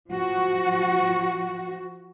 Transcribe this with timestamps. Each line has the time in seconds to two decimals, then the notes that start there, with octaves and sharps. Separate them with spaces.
0.11 F3 F#4